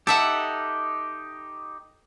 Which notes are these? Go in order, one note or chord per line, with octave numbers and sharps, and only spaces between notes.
D#4 G4 A4 E5 F#5